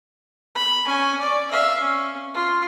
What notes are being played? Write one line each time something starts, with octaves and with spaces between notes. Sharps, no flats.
B5
C#4 G#5
D5
E5 F5
C#4
F4